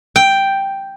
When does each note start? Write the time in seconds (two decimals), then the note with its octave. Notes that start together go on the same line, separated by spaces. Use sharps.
0.16 G5